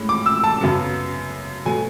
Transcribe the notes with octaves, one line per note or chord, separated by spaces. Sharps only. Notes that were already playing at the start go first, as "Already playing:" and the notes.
Already playing: A2 G#3 C#4
D6
E6
A5
F#2 C#3 F#3 B3
B2 F#3 A3 G#5